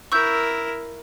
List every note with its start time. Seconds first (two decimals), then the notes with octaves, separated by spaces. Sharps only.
0.12 E4 A#4 C#6 E6 G6